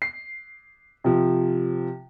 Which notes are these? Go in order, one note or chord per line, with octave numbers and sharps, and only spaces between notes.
C7
C3 F3